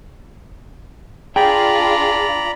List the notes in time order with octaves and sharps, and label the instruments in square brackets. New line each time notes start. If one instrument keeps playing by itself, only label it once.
[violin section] D4 F4 [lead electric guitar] G#4 [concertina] D5 A#5 B5 [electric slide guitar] G5